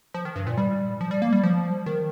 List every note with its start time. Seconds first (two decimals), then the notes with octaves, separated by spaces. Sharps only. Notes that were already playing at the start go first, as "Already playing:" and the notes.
0.14 F3
0.25 D#3
0.36 G2
0.47 A#2
0.58 G3
1.01 F3
1.11 G3
1.22 A#3
1.33 G3
1.43 F3
1.86 D#3